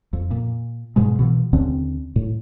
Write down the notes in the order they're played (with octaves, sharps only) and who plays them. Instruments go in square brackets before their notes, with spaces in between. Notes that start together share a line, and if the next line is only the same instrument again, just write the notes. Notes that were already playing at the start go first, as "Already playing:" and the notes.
[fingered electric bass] F2
A#2
G#2 B2 G#3
B2 E3 F3
D#2 D3 C4 C#4
A2